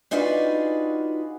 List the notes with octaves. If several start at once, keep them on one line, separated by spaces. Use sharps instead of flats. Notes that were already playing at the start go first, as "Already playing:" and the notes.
D4 D#4 F4 F#4 G#4 B4